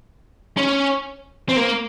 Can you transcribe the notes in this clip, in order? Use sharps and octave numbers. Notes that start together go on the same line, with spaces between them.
C#4
C4
A#3